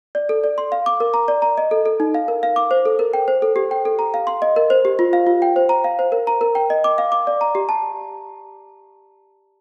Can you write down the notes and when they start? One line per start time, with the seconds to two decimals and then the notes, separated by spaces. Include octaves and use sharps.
0.15 D5
0.29 A4
0.44 D5
0.58 C6
0.72 F5
0.86 D6
1.00 A#4
1.14 A#5
1.28 D5
1.42 A#5
1.58 D#5
1.71 A4
1.86 A4
2.00 D#4
2.14 F5
2.28 A#4
2.43 F5
2.56 D6
2.71 C5
2.86 A4
2.99 A#4
3.13 G5
3.28 C5
3.42 A4
3.56 G4
3.71 G5
3.85 A4
3.99 A#5
4.14 F5
4.27 C6
4.42 D#5
4.56 A#4
4.70 C5
4.85 G4
4.99 F4
5.13 F5
5.27 F4
5.42 G5
5.56 C5
5.69 A#5
5.84 F5
5.99 C5
6.12 A#4
6.27 A#5
6.41 A#4
6.55 G5
6.70 D#5
6.84 D6
6.98 F5
7.12 D6
7.27 D5
7.41 A#5
7.55 G4
7.69 A5